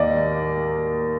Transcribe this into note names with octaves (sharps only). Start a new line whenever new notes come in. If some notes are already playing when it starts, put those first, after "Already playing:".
Already playing: D#2 D#3 A#3 D5 D#5